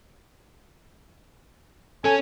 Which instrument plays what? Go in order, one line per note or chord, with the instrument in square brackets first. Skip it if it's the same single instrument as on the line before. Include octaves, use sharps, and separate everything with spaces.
[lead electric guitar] C#4 [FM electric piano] A4 [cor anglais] G#5